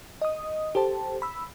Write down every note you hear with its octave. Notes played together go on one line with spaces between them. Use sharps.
D#5 D#6
G4 A4 C5 A5
B5 E6